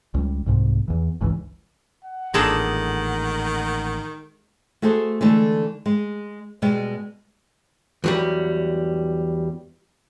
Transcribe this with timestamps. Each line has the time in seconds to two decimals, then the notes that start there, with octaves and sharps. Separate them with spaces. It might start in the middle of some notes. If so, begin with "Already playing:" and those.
0.14 C#2 G3
0.46 C2 G#2 C3
0.88 E2 E3
1.21 G1 C#2 A#2 E3
2.05 F#5
2.34 A1 A#2 D#3 G#3 D4 A4
4.82 A3 F#4 G#4 A4 C5
5.21 D3 E3 G#3 A3
5.86 G#3
6.62 B2 G3 G#3 B3
8.04 E2 F#3 G3